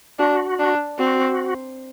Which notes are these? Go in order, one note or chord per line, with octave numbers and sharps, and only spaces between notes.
D4 F#4
D4
C4 F#4